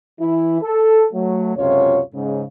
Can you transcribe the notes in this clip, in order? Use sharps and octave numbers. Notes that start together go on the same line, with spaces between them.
E3 E4
A4
F#3 A3
C#2 F#2 C3 F4 C#5
G#2 C#3